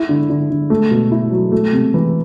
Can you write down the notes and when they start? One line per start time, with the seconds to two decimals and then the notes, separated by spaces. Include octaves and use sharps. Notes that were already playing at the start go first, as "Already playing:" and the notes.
Already playing: E4
0.09 D3
0.30 D3
0.50 D3
0.70 A3
0.91 B2
1.11 E4
1.31 F#3
1.52 A3
1.73 C3
1.94 E3